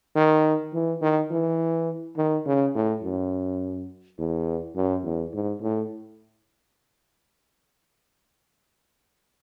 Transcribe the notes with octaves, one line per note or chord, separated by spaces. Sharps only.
D#3
E3
D#3
E3
D#3
C#3
A2
F#2
E2
F#2
E2
G#2
A2